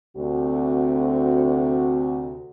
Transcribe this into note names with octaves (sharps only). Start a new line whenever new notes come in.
D2 C3 F#4